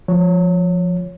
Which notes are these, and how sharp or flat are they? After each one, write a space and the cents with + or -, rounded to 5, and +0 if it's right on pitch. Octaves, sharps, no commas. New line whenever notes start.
F3 +0 C#5 +0